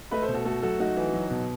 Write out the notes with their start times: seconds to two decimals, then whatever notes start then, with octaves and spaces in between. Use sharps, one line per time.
0.11 A3 B4 D#5
0.22 A4 C5
0.28 B2
0.34 F#4 A4
0.45 A3 F#4 A4
0.62 F#3 F#4 A4
0.79 A3 D#4 F#4
0.97 E3
1.13 F#3
1.31 B2